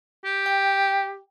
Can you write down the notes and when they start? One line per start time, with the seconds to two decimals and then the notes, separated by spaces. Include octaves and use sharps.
0.25 G4
0.46 G5